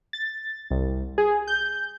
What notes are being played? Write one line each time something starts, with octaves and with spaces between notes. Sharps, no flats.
A6
C2
G#4
G6